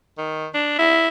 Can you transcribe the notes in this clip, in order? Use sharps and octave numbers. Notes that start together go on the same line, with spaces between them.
D#3
D4
E4